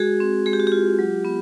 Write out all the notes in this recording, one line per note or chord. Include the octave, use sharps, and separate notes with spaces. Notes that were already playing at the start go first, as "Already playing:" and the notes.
Already playing: G#3 F#4 G#4
C4
G#3 G#4
G4
F#4
F4 G4
F#3
B3